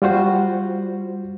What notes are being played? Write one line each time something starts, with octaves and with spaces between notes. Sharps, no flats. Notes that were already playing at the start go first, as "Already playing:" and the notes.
G3 F4 F#4 C5